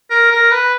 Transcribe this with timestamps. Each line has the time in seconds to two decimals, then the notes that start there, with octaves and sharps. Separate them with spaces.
0.11 A#4
0.32 A#4
0.52 B4